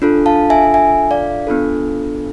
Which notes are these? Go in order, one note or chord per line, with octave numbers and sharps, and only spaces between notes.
D4 F4 A4
F5 A5
E5 G#5
E5 G#5
D5 F5
B3 D4 F4 A4